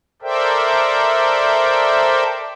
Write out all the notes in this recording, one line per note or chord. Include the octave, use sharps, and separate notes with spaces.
A4 A#4 C5 D5 E5 G5